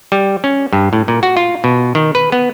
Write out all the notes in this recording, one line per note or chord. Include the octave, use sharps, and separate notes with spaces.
G3
C#4
G2
A2
A#2
F#4
F4
B2
D#3
B4
B3